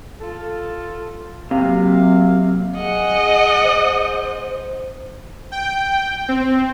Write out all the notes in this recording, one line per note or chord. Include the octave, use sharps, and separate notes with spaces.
F4 A4
C3 F#3 A#3 F5
G#4 D#5 F#5
C5
G5
C4